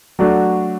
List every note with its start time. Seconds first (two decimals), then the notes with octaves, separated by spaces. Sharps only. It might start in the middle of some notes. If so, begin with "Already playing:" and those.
0.19 F#3 A3 D4 F#4